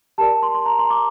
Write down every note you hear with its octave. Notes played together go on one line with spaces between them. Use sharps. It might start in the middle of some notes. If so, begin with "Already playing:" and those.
G4 A#4 D5 A5
C6
C6
A#5
C6
D6